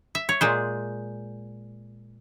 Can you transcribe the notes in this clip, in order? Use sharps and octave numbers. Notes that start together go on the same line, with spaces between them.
E5
C#5
A#2 G#3 C5